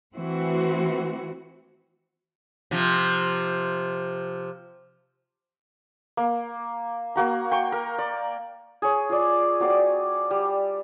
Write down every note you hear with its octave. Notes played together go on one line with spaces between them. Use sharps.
E3 A3 C4 F#4
C3 F3
A#3
A#3 F#4 A#5
G5 C#6
A#4
D5
G#4 C#5
F4 D5
F#3 C4 D5 F5
G3